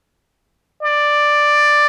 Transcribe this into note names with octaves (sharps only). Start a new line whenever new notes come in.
D5